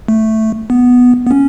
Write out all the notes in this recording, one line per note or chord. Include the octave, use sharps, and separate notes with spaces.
A3
B3
B3
C#4